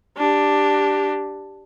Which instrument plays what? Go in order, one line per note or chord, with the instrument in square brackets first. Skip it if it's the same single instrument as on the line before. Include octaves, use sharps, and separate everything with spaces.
[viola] D4 G4